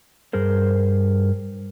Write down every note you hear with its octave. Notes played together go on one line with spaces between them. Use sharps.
G2 G#4 A#4 C5